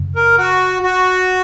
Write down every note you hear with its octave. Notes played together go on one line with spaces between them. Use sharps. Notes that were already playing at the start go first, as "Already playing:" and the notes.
Already playing: F#2 C#3
A#4
F#4
F#4